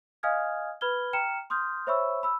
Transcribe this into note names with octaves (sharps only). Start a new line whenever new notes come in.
D#5 F5 G#5 D#6 F6 G#6
B4 B5 F6 G#6 G7
G5 A#5 F6 C#7 E7
C6 D#6 F6 G6
C5 C#5 E5 B5 C#6 E6
B5 E6